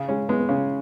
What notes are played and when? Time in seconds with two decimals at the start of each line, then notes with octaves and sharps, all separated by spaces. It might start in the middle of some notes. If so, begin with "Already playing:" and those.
Already playing: C#3
0.08 G#3 C#4
0.29 G#3 B3
0.39 B3
0.49 C#3 C#4